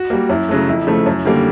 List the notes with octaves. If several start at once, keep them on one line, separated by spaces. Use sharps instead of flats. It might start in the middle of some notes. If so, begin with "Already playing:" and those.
Already playing: F#4
G3 A#3
F#2 E4
C#3 F#3 A3
F2 E4
C#3 F3 A3
F#2
D3 G3 A#3